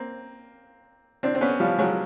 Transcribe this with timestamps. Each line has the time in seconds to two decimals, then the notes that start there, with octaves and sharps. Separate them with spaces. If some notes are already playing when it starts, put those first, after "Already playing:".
Already playing: A#3 C4
1.23 C4 D4
1.35 C4
1.41 B3 C#4
1.60 F3 G3
1.78 F#3 G#3